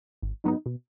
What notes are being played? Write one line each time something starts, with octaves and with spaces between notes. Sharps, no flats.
G#1
G#2 F#3 B3 D#4
B2